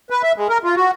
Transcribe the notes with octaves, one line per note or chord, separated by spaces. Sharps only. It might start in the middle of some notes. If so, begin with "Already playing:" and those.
B4
E5
G#3
A#4
F4
F#4